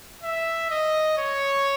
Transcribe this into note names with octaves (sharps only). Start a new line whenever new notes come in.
E5
D#5
C#5